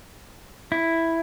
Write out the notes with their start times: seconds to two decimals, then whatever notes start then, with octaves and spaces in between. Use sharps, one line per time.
0.72 E4